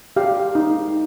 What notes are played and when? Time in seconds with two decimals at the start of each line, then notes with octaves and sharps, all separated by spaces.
0.16 G4 F5
0.55 D#4